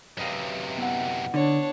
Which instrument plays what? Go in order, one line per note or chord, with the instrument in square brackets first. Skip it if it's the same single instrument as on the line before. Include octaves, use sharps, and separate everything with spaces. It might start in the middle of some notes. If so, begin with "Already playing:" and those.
[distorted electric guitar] F#2 C3 [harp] B4 D#5 F5
[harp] B3 E4 F#5
[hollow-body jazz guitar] D3 [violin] D4 C#5